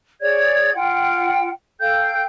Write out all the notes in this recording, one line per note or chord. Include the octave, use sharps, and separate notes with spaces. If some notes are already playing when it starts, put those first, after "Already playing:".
G#4 C#5 D5 G#6
F4 F#5 G5
A4 F5 G5 G6